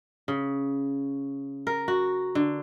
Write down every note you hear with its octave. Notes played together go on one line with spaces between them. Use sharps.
C#3
A#4
F#4
D3